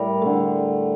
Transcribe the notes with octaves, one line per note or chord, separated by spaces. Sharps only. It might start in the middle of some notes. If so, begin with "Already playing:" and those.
Already playing: A2 G3 A#4
D3 A3